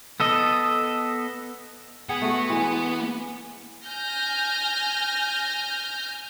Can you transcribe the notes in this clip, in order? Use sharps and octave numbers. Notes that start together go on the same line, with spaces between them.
B3 A4 D#5
B3 G#4 F#5
A3 F#4
E3 G#3
G#5 F6 G6 A#6